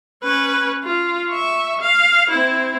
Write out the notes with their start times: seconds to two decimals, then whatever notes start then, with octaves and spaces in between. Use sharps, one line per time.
0.23 C#4 B4
0.84 F4
1.30 E5 C#6
1.81 F5
2.30 C4 E4